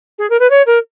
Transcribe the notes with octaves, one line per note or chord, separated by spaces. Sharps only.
G#4
A#4
B4
C#5
A#4